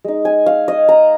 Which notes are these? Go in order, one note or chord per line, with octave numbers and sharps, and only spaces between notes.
G#3 D#4
G#5
F5
D#5
A#5